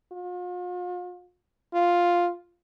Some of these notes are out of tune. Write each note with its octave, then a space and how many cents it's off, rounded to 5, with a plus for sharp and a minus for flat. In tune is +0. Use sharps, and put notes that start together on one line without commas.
F4 +40
F4 +0